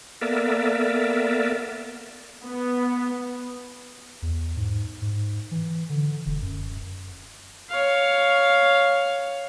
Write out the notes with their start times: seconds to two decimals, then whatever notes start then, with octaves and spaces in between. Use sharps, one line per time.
0.22 A#3 B3 A4 A#4 D5 E5
2.45 B3
4.22 E2
4.57 G#2
5.02 G#2
5.51 E3
5.89 D3
6.26 E1
6.42 F#2
7.69 C#5 F5